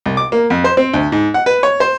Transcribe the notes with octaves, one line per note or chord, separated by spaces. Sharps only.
C2
D6
A#3
F2
C5
C4
D2
G#2
F#5
B4
C#5
C5